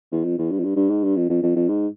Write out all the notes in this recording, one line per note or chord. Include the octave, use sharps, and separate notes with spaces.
E2
F2
E2
G2
F2
G2
G2
G#2
G2
F2
F2
F2
F2
G#2